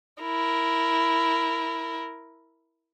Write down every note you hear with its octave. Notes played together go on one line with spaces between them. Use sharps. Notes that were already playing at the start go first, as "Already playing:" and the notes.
E4 A#4